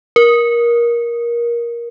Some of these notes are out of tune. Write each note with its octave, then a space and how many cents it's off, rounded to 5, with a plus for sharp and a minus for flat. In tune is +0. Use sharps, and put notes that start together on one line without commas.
A#4 +20